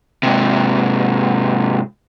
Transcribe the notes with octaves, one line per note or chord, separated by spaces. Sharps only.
G#2 C3